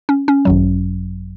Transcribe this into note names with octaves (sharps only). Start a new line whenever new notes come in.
C#4
C#4
G#1 F#2 F#3